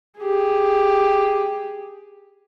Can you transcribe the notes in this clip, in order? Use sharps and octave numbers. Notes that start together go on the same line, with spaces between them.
G4 G#4